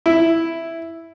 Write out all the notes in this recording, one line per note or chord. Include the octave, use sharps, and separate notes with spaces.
E4